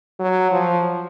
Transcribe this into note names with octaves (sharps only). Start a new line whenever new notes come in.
F#3
F3